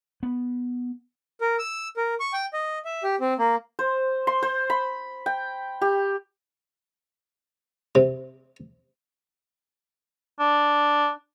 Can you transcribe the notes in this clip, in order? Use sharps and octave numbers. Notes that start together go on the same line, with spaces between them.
B3
A#4
E6
A#4
C#6
G5
D#5
E5
G4
C4
A#3
C5
C6
C5
B5
G5
G4
C3
D4